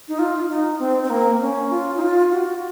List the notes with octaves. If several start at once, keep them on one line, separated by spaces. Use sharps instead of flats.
D#4
F4
D#4
C4
C4
A#3
C#4
F4
D#4
F4
F#4